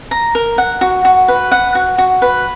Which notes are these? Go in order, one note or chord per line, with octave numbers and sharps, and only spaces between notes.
A#5
A#4
F#5
F#4
F#4
B4
F#5
F#4
F#4
B4